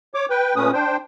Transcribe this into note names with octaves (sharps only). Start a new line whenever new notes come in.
C#5 D6
B4 G5
A#2 A3 C#4 B4 D#6
D4 C5 G5